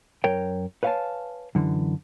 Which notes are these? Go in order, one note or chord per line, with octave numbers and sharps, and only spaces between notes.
F#2 A#4 C#5 G5
B4 C#5 F5 F#5 G#5 A5
F#2 D3 E3